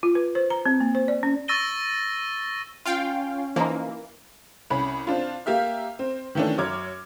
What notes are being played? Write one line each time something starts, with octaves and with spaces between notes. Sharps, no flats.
F4
B4
C5
A#5
C4
A#3
C5
D5
C#4
C#6 E6 A6 A#6 D#7 G7
C#4 F4 F5 G5
E3 F3 A#3 D#4
C2 C#4 B5
C4 D4 F4
A#3 G4 E5 F6
C4
D#3 E3 A3 C#4 D4
F#2 C#5 D6 F6 G#6